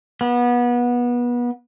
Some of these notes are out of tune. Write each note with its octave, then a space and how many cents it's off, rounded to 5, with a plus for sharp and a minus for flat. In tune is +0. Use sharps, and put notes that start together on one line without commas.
B3 -25